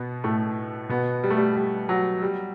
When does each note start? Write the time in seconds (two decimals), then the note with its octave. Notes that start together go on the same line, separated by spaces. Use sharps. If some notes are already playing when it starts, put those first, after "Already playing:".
Already playing: B2 B3
0.24 A2 A3
0.89 B2 B3
1.23 G3
1.30 A3
1.37 G3
1.56 G3
1.89 F#3
2.22 G3